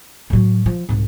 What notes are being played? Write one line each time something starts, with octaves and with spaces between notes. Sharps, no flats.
A2 F#3
F3
C2 G#2